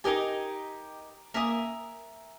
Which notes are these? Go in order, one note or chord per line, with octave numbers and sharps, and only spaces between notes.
D#4 G4 A#4 D#5 G#5
A#3 A#4 E5 G#5 D#6